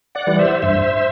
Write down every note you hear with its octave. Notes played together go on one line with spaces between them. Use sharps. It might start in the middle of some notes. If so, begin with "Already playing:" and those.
D5 F#5
E3 G3
C5 E5
G2 C5 E5